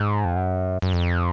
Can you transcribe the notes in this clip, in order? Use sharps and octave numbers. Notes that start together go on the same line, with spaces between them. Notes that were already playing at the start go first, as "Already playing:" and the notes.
Already playing: G#2
F2
F#2
F#2
F2